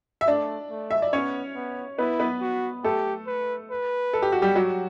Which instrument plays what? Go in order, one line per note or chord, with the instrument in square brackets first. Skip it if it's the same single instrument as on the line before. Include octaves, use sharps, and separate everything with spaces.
[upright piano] E5
[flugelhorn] A3 [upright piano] D4 D5
[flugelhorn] A3
[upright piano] E5
D5
[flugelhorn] B3 [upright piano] C#4 C#5
[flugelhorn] B3
[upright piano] B3 B4 [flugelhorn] E4
[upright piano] B3 B4
[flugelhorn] F#4
[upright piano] A3 A4 [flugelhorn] G4
[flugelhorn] B4
B4
[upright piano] A4
G4
F#4
G3 G4
[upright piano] F#3 F#4 [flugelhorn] G4